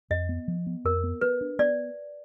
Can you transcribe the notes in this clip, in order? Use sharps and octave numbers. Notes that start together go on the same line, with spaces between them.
F2 D#5
B3
F3
B3
F2 A#4
B3
B3 B4
D4
B3 D5